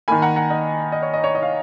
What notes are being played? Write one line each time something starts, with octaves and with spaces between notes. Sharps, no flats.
D#3 A#3 G#5 B5
F#5 A#5
F#5 A#5
D#5 F#5
D#5
C#5
D#5
C#5
D#5
F5